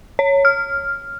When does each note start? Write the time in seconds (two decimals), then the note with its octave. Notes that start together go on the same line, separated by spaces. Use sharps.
0.19 C#5
0.45 F6